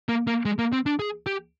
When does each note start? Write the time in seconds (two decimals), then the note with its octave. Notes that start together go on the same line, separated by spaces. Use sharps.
0.09 A#3
0.27 A#3
0.45 G#3
0.59 A#3
0.72 C4
0.86 D4
0.99 G#4
1.26 G4